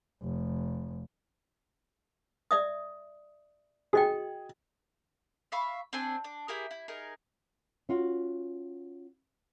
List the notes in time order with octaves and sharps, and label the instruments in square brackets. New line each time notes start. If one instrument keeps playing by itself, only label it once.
[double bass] F1
[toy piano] D5 E5 D#6
[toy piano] F#4 D#5 G5 [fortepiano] G#4
[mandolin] E5 F5 B5 C#6
C4 D4 G#5
D4
E4 G4 G#4 A#4
E4
D#4 G#4 A#4
[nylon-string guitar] C#4 F4 F#4